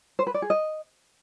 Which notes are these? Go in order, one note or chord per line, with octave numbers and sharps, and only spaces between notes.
C5
B4
D5
G#4
D#5